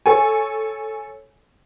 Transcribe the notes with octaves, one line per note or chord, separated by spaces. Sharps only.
A4 C#5 G#5